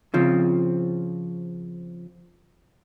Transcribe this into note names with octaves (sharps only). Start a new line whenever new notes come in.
C#3 F3 C4